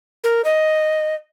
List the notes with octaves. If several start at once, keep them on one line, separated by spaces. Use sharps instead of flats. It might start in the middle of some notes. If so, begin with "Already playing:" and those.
A#4
D#5